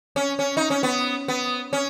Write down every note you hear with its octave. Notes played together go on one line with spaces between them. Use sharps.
C#4
C#4
D#4
C#4
B3
B3
C#4